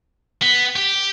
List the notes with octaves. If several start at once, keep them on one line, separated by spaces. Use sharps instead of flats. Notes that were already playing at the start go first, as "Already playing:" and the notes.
B3
G4